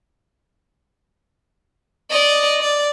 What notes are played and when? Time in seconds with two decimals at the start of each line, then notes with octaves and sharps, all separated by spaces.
2.10 D5 D#5
2.60 D5